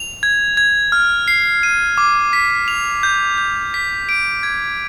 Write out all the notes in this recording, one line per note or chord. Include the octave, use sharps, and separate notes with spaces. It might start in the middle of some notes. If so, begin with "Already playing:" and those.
Already playing: F7
G#6
G#6
F6
C7
D#7
D6
B6
F7
G6
G6
B6
D7
G#6